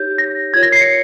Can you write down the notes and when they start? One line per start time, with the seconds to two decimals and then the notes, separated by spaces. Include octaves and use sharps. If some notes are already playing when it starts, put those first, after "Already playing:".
Already playing: D#4 G4 C#5 G6
0.18 A#6
0.54 F4 A#4 C#5 G#6
0.63 A#6
0.72 C7
0.81 C#7